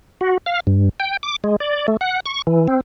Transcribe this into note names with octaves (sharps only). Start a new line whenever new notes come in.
F#4
F5
G2
G5
D6
G#3
D5
A3
F#5
C#6
E3
C4